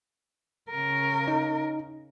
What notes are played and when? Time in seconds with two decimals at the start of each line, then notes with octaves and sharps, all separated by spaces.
0.70 C#3 A#4
1.28 D#4